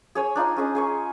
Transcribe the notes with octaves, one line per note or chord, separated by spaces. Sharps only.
G#4 C#5 G#5
D4 D#4 F4 G#5
C#4 G#4 D#5
G#4 G#5 C#6